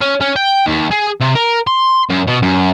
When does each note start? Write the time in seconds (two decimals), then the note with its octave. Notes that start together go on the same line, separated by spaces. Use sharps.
0.01 C#4
0.21 C#4
0.36 G5
0.67 D#2
0.91 G#4
1.21 C3
1.36 A#4
1.67 C6
2.09 F#2
2.27 B2
2.42 F#2